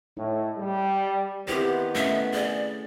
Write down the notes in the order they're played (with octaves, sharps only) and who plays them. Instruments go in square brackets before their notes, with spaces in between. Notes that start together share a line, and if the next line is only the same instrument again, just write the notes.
[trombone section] A2 [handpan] D#4
[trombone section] G3
[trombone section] D#3 B3 [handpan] C4 E4 C5 [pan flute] G4
[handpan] A3 C#4 A4 [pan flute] E5
[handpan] G#4 [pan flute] D5